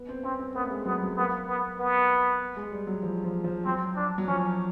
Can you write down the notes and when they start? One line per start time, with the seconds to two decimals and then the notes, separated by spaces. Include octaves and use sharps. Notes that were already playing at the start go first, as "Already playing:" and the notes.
Already playing: B3
0.09 C4
0.23 C4 C#4
0.39 C4
0.55 A#3 B3
0.64 A3
0.70 G#3
0.85 F#3 B3
1.02 F#3
1.17 A#3 B3
1.48 B3
1.79 B3
2.57 G#3
2.72 G3
2.87 F#3
3.03 F3
3.24 F3
3.44 F3
3.65 F#3 C4
3.96 D4
4.18 F#3
4.27 F3 C#4